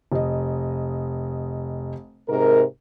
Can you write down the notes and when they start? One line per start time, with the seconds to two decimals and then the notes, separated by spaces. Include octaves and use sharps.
0.12 F1 D#5
2.29 G#2 C3 A#4